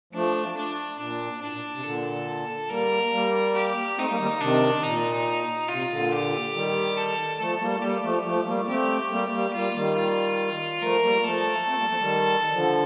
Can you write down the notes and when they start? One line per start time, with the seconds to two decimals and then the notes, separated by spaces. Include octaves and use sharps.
0.13 F3 A3 D4
0.57 D4
0.98 A#2 D4
1.42 A2 D4
1.53 A#2
1.74 C3
1.84 A#2 D3 A4
2.69 G3 A#3 A#4
3.13 G3 A#3
3.55 G4
3.97 A3 C4 D#4
4.09 G3 A#3
4.20 D#3 G3
4.41 C3 D#3 D4
4.83 A#2 D#4
5.69 C3 F4
5.90 A#2 D3
6.12 G4
6.54 D#3 G3
6.97 A4
7.39 F3 A3 A4
7.61 G3 A#3
7.82 G3 A#3 G4
8.03 F3 A3
8.25 F3 A3
8.46 G3 A#3
8.68 A3 C4 G4
9.10 G3 A#3
9.32 G3 A#3
9.53 G3 A#3 F4
9.74 D#3 G3
9.95 F4
10.82 F3 A3 A#4
11.03 G3 A#3
11.24 F3 A3 A4
11.67 A3 C4
11.77 G3 A#3
11.88 F3 A3
11.99 D#3 G3
12.52 D3 F3